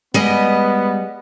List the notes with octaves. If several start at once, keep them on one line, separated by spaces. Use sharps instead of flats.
G3 G#3 B3 D#5